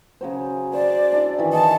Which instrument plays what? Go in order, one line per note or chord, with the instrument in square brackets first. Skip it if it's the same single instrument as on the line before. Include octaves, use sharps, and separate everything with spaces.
[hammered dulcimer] C#3 F#3 C5
[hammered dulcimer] C5 [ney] D5
[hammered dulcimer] D4 E4
D#3 E3
[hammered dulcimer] G#4 D#5 [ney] A5